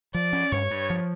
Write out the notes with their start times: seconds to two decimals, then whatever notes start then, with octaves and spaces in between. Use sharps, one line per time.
0.14 F3 D5
0.33 C#4
0.52 G2 C#5
0.71 G2
0.90 F3